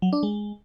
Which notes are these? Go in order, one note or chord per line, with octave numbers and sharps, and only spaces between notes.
F#3
D4
G#3